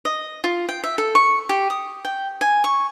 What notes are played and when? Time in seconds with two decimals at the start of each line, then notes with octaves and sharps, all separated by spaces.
0.05 D#5
0.44 F4
0.69 G5
0.84 E5
0.98 A4
1.15 C#6
1.49 G4
1.70 D#6
2.05 G5
2.41 G#5
2.64 C#6